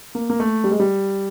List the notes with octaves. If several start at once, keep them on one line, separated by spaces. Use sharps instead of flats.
A#3
A#3
A3
G3
G#3
G3